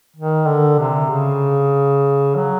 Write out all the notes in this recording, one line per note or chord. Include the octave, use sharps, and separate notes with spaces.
D#3
D3
C3
C#3
F#3